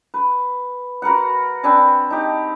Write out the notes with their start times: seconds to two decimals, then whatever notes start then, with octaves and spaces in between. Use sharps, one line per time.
0.14 B4
1.02 F#4 A#4 B4 F#5
1.64 C4 D4 B4 G#5
2.10 D#4 G4